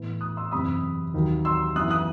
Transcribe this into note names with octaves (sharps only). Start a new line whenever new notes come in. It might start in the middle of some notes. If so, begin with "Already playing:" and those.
Already playing: A2 E3 B3
D#6 F#6
C6 E6
F#1 E2 C3 B5 D#6
D#2 D#3 F#3
C6 E6
F#2 E3 B3 E4 D#6 F#6
D#6 F#6